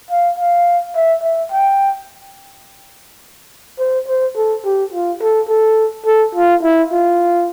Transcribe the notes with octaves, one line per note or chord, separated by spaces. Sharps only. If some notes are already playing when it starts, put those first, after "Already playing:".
F5
F5
E5
E5
G5
C5
C5
A4
G4
F4
A4
A4
A4
F4
E4
F4